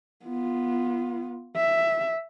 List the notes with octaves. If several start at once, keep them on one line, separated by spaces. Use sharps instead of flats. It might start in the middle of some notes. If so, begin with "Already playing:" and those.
B3 F4
E5